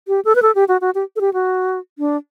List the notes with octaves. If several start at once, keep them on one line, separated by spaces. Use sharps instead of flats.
G4
A4
B4
A4
G4
F#4
F#4
G4
A4
G4
F#4
D4